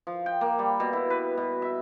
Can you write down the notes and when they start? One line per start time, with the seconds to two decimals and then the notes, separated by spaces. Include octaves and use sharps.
0.07 F3
0.26 G5
0.41 A#3
0.59 G3
0.80 B2
0.93 E4
1.10 B4
1.37 B2
1.62 E5